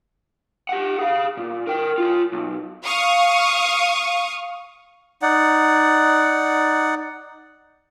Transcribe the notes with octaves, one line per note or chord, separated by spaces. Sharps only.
G4 F#5
G#4 F5
A#2
A#4 G5
F4 C#5
B1
F5 C#6 D#6
D#4 D5 F#5